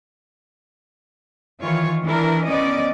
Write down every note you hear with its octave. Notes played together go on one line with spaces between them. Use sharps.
D#3 E3 F4 C#5
E3 D4 E4 A#4
B3 C#4 D5 D#5